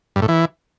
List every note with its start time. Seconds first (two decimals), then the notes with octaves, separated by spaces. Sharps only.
0.16 G2
0.22 A2
0.28 E3